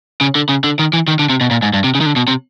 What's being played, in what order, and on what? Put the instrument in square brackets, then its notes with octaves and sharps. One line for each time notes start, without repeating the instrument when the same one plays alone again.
[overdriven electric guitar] C#3
D3
C#3
D3
D#3
E3
D#3
D3
C3
B2
A#2
G#2
G2
C3
C#3
D#3
D3
B2
C3